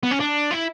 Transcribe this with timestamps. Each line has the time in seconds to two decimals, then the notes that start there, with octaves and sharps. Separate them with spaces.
0.03 B3
0.11 C#4
0.20 D4
0.51 E4